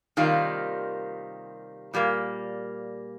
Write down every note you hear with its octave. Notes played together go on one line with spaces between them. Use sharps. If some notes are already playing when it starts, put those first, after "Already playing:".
C3 D#3 G3 A#3 F4
A#2 G3 A#3